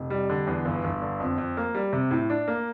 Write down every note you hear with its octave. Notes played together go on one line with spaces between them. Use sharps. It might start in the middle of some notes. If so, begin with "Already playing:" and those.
Already playing: F1
G3
D3
E2
G1
G1
D3
F2
F2
A#3
G3
C3
A2
D4
A#3